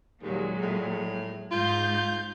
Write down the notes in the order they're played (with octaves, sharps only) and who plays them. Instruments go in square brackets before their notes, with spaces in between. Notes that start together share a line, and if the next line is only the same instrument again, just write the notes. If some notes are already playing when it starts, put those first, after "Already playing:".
[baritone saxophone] D#2 [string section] A#2 F#3 G#3
[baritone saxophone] A2
[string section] G#2 G6 [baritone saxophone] F4